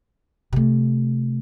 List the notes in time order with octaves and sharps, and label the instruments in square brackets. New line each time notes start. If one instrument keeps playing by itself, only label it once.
[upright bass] C3 A3